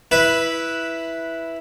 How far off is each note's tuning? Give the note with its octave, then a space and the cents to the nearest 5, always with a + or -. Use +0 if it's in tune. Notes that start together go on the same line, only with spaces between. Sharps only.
E4 +0 B4 -10